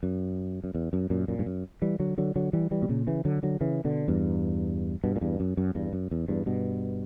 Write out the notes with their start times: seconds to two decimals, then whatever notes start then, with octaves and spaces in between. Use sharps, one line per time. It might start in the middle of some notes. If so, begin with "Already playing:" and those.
0.03 F#2
0.64 F#2
0.75 E2
0.93 F#2
1.10 F#2 A#2
1.28 F#2 A#2
1.39 G2
1.46 F#2
1.82 E3 G3
1.99 D3 F#3
2.18 D3 F#3
2.36 D3 F#3
2.53 E3 G3
2.71 E3 G3
2.82 B2
2.89 A#2 C#3
3.07 C#3 E3
3.25 D3 F#3
3.43 D3 F#3
3.61 C#3 E3
3.84 B2 D3
4.08 E2 G2
5.04 G2 B2
5.16 A#2
5.21 E2 G2
5.40 F#2
5.57 F#2
5.75 E2 G2
5.93 F#2
6.11 E2
6.28 E2 G2
6.46 G2 B2